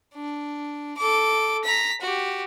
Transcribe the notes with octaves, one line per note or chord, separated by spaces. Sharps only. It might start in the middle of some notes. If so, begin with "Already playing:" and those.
D4
A4 D6
A#5 B6
F#4 G4